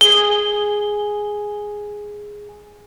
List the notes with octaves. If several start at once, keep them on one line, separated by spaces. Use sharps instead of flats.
G#4 G7